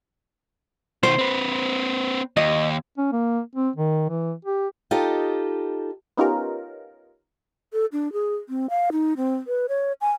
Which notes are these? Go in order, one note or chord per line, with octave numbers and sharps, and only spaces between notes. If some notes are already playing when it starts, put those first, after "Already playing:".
B2 D#3 C5
C4 B4
D#2 D#5
C#4
A#3
C4
D#3
E3
G4
D#4 F4 G4 A4 D#5
B3 C#4 D#4 F4 G4 A#4
A4
D4
G#4
C4
F5
D#4
C4
B4
C#5
G#5